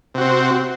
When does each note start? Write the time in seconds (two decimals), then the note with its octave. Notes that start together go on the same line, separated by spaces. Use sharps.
0.14 C3
0.18 F#4
0.21 C4